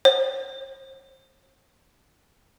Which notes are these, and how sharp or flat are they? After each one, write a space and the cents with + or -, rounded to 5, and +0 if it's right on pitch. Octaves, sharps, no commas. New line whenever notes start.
C5 +45